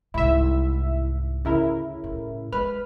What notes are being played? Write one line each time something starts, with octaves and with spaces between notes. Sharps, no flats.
C2 G#2 E4 E5
D2 C#3 E4 A#4
A2
G#3 B4 B5 F6